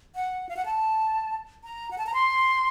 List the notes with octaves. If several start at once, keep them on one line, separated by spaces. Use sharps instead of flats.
F#5
F5
F#5
A5
A#5
F#5
A5
A#5
C6